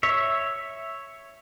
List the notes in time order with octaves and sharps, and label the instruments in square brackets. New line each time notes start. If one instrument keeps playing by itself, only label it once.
[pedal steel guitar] C#5 E5